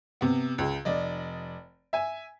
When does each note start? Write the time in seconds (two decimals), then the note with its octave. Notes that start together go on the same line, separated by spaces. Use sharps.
0.21 C3 B3
0.58 C#2 G#3
0.85 F1 D5 D#5
1.93 E5 G#5